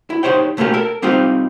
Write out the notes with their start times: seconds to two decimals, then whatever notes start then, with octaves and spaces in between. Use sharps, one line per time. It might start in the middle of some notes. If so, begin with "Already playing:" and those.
0.10 E4
0.23 D#4 G4 C5 C#5 G5
0.57 B2 A3 A#3 C#4 G4
0.74 A4 A#4
1.02 G3 C4 D#4 F4 G4